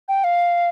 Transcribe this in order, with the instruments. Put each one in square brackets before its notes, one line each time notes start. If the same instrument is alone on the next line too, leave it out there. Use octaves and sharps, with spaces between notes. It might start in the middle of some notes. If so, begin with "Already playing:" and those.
[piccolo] G5
F5